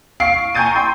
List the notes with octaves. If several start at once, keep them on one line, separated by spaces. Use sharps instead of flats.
F5 C#6 C7 D7
G#5 A#5 C#6 G6 A6 D#7
G5 C6